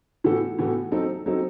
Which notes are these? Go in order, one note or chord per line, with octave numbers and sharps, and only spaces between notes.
A2 E3 B3 F#4 A4
A2 E3 B3 F#4 A4
F#3 C4 D#4 A4
F#3 C4 D#4 A4